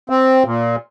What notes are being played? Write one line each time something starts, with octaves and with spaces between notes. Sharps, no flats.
C4
A#2